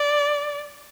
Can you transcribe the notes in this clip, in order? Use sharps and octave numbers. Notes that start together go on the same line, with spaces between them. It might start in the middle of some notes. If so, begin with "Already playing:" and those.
Already playing: D5